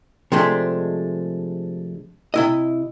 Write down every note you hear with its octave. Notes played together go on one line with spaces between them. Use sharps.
C3 F3 G#3 A3 D4
C3 E4 D#5